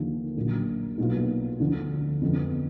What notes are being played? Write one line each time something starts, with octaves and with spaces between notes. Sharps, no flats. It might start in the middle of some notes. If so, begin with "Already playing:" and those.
Already playing: D#2 D3 F3 A#3
A#1 A#2 F#3
B1 A#2 F#3 B3 F4
D2 D3 F3
F2 D3 F3 B3